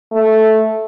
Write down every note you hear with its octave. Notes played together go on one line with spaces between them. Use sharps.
A3